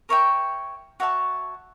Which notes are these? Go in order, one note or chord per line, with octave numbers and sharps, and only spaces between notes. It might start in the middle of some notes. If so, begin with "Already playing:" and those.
A#4 C#5 E5 G5
F#4 C#5 E5 A5